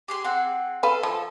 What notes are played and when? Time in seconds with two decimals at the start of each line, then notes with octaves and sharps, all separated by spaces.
0.08 G4 G#4 C6
0.24 C4 G#4 F#5
0.83 A4 B4 F5
1.03 F3